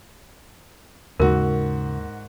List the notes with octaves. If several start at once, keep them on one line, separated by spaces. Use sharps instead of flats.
D#2 G#2 C#3 F#4 A#4